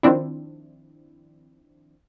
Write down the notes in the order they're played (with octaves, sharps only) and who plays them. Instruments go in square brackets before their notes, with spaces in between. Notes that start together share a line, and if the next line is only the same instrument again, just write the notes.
[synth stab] D#3 F3 C4 D4 E4